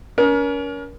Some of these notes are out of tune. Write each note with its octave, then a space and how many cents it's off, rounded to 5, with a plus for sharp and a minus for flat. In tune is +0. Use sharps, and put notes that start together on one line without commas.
C#4 +35 A#4 +30